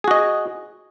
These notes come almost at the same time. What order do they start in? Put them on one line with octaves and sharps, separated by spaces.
G#4 F#4 D#5